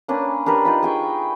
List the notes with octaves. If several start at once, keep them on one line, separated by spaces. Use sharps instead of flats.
A#3 C#4 D4 B4
D4 G4 A#4 B4
D#4 F4 B5
G#4 G5 C#6